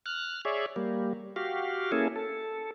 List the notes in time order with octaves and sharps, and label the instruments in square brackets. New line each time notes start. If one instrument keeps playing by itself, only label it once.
[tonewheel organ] F6 F#6
G#4 C#5 D5 E5
G3 A#3
F#4 G4 F5
A#3 C#4 E4 G#4 A4
A4